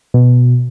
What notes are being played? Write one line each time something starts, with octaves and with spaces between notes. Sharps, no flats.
B2